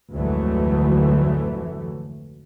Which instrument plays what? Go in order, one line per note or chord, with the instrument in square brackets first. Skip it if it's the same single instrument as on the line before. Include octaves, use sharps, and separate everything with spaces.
[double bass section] F1 D2 G#2 E3 F#3 A3